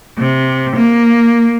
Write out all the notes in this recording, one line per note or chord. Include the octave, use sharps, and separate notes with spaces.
C3
A#3